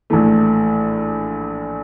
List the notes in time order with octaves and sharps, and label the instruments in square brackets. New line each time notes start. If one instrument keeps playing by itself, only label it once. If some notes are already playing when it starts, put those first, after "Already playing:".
[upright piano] A#1 A2 E3 A3